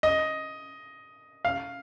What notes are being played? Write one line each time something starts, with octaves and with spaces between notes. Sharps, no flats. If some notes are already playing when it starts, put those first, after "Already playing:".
D#5
F5